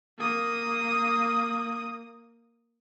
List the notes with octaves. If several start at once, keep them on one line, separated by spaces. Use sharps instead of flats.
A#3 D#6